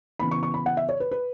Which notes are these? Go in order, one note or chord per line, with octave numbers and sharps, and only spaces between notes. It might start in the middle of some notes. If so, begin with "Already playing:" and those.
C#3 E3 B3 B5
C#6
C#6
B5
F#5
E5
C#5
B4
B4